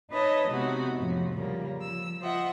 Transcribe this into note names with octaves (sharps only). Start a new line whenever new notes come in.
D#4 B4 C#5 D#5 E5 A5
C3 G#3 B3 D#4 F#4
F2 A2 C3 F3
C#3 F3 G3 A#3
F3 E6
F4 C5 D#5 E5 F#5